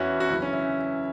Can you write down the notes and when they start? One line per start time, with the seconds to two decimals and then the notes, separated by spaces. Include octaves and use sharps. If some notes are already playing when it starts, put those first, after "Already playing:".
Already playing: E2 E3 C#4 E4 F#4
0.20 F#4
0.30 F#2 C#3 E3 E4
0.42 C#4
0.53 E4